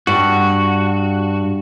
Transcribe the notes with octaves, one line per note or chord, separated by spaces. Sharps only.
G2 F#4